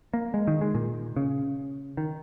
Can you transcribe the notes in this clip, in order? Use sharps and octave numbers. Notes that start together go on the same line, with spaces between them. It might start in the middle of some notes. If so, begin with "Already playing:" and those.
A#3
G#3
D#3
G#3
A#2
C#3
D#3